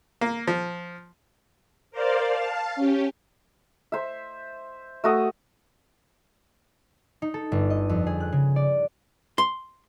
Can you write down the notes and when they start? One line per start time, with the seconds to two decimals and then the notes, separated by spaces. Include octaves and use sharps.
0.21 A#3
0.48 F3
1.91 A#4 C5 D5 F5
2.27 F5 A5
2.76 C#4 G4
3.92 C5 E5
5.04 A3 F#4 D#6
7.22 D#4
7.34 A4
7.52 G1
7.70 D#5
7.89 F2
8.07 G#4
8.20 F#6
8.32 C#3
8.56 D5
9.38 C6